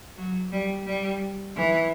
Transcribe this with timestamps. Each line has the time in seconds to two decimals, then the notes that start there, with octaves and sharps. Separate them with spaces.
0.17 F#3
0.52 G3
0.87 G3
1.57 E3